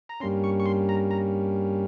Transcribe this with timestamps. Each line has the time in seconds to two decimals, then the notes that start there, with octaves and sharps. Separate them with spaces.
0.09 A#5
0.20 G2 G3 A#3 C#4 C6
0.44 C#6
0.60 C#6
0.66 C6
0.89 A#5
1.11 A#5